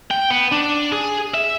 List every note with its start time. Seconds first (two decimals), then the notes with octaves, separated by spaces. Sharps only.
0.11 G5
0.30 B3
0.52 D4
0.92 G#4
1.34 E5